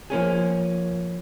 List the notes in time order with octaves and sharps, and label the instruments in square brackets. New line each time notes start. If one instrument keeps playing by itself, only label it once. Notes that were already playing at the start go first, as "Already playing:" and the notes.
[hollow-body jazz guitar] F3 A#3 C#4 G#4